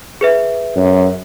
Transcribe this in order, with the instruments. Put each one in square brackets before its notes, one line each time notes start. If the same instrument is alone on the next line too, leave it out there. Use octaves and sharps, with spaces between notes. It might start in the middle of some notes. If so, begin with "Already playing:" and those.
[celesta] G#4 B4 E5
[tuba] F#2